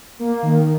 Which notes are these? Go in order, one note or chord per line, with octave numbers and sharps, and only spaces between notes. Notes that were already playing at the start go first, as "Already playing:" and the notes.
A#3
D#3